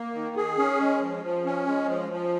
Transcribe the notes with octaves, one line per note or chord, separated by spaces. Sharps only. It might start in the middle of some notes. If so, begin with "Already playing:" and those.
Already playing: A#3
D#3
G#4
C#4
G#3
F3
F3
C#4
G#3
F3
F3